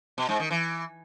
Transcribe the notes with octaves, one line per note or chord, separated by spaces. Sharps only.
B2
G#2
D#3
E3